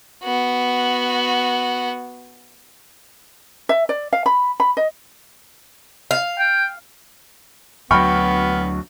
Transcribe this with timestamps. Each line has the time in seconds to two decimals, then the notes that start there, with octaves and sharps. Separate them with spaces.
0.24 B3 F#4
3.69 E5
3.89 D5
4.13 F5
4.26 B5
4.60 B5
4.77 D#5
6.11 F5
6.39 G5
7.91 D2 F#3 B3 G5 B5 C#6 F6